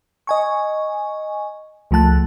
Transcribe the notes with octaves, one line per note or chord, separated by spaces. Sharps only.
D#5 G#5 C#6
C#2 F3 A3 A5 F#6